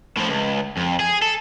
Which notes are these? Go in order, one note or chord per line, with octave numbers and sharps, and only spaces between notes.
A2 F3
C#2
F2
G#4
A4